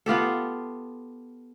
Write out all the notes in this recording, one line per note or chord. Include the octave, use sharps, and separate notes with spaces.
B3 F4 G4 A4